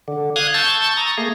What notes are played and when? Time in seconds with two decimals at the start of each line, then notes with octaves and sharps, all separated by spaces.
0.08 D3
0.36 F5 D#6 F#6 G#6
0.54 A5 C#6 E6 G6 A6
0.97 A#5 C#6 D#6
1.17 A3 A#3 G#4